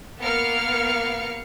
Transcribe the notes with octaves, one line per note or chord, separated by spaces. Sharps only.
A#3 B3 A#4 F5 F6 C#7